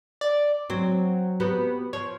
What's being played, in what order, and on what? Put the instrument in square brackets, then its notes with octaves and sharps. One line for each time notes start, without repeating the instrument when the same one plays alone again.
[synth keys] D5
[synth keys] F#3 [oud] C4
[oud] B3 F#4 G4
[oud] F3 [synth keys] C#5